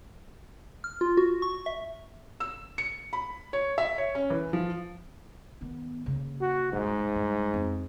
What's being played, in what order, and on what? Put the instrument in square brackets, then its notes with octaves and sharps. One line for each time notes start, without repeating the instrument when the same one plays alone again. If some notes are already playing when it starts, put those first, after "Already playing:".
[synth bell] F6
F4
F#4
C#6
E5
[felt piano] E6
C#7
B5
C#5
E5
C#5
C#4
E3
F3
[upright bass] D#3 B3
C#3 A#3
[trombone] F#4
[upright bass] D#1 A1 [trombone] G#2
[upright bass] G2
F2